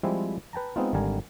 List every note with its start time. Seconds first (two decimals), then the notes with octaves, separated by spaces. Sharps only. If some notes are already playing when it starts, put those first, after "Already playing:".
0.03 F3 G3 G#3 C4 E4
0.53 B4 G5 A5 A#5
0.76 G#3 B3 C4 D#4 F4
0.93 G#1 D3 G3 A#4 G#5